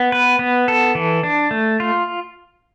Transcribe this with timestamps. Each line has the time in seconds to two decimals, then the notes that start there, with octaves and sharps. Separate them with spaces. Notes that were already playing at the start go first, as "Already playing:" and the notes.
Already playing: B3
0.12 B4
0.39 B3
0.68 A4
0.95 E3
1.23 D4
1.51 A3
1.80 F4